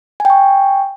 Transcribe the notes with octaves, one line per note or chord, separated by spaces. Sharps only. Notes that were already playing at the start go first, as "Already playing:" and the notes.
G5 G#5 C#6